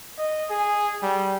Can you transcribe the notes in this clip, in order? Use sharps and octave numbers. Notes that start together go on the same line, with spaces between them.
D#5
G#4
G3